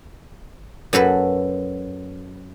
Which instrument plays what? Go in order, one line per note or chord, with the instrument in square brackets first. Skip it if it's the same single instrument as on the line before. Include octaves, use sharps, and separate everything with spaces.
[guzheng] F#2 F#3 A4 B4